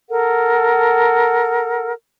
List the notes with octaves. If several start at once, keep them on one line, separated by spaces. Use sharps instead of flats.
A4 A#4 F#5